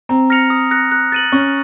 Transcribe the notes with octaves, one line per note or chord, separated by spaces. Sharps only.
C4 A#5
F6 A#6 C#7 F7
D#6
F#6 A#6 C#7
F#6
A6 D#7 F#7
C#4 C#6